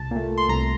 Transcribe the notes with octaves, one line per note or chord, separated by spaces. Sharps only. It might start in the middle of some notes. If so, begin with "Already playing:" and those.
Already playing: C2 A5
A#2 A3
C6
C2 A#5